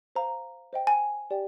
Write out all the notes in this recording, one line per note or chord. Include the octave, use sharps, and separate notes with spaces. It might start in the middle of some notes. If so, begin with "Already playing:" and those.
C5 F5 A#5
C5 D#5 G5
G#5
G4 D5 G5